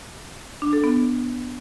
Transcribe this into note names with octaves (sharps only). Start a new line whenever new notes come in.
D4
A4
B3